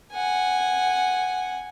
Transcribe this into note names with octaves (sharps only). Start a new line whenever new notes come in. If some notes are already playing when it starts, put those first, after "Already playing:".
F#5 G#5